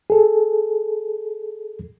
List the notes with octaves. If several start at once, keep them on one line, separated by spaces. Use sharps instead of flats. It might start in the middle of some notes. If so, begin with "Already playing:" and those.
G#4 A4